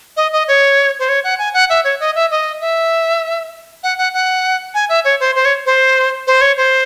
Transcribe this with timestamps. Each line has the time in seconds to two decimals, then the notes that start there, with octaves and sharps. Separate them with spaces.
0.17 D#5
0.32 D#5
0.48 C#5
0.99 C5
1.09 C#5
1.24 F#5
1.39 G#5
1.54 F#5
1.70 E5
1.84 C#5
2.00 D#5
2.15 E5
2.31 D#5
2.61 E5
3.83 F#5
3.98 F#5
4.14 F#5
4.74 G#5
4.89 E5
5.05 C#5
5.20 C5
5.36 C5
5.45 C#5
5.66 C5
6.27 C5
6.41 C#5
6.57 C5